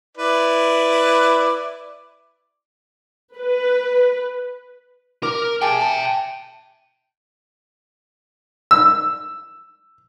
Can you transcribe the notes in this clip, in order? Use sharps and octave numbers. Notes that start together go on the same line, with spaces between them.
E4 B4 D5
B4
A#4 D6
G4 G#4 E5 G5 A5
A5
E6